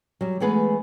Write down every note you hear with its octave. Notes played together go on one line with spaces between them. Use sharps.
F#3 G3
E3 G#3 A3 B3 G#4 B4